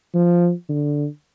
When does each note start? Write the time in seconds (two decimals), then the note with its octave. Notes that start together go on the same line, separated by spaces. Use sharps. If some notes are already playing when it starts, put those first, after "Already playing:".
0.14 F3
0.69 D3